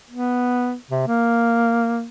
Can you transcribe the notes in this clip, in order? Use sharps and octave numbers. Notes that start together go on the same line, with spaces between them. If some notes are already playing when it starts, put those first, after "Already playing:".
B3
C3
A#3